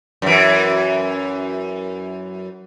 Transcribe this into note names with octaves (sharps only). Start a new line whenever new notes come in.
F#2 E3